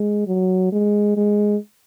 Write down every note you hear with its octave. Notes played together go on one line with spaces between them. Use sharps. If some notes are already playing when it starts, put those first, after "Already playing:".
Already playing: G#3
F#3
G#3
G#3